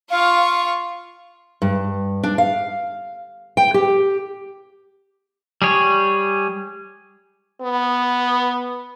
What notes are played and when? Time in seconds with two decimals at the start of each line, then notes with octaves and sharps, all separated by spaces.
0.10 F4 F5 C#6
1.62 G2
2.23 D4
2.38 F5
3.57 G5
3.74 G4
5.62 G3 G#4 C#5
7.61 B3